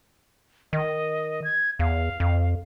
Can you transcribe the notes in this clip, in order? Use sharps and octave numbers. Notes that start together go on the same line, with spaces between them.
D#3 D#5
G#6
E2 F5
F2